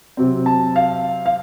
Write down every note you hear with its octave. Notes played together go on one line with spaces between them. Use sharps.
C3 F#3 C4
A5
F5
F5